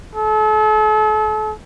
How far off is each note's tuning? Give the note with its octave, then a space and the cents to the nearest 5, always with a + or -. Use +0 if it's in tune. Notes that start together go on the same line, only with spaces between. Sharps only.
A4 -40